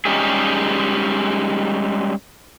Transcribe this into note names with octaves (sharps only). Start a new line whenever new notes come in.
G3 G#3 C#4 D#4 G4 G#4